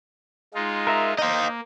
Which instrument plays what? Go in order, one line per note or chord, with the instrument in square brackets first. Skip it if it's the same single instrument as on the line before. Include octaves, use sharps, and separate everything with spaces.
[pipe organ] G#3 D#4 F4
[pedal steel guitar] A#4 E5 A#5
[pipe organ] A#3 [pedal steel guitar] D#4 C5 [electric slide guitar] D#5 F5